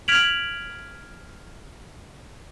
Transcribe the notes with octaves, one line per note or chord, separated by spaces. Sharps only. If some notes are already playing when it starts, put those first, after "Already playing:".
F6 G#6 B6 D7 F7 F#7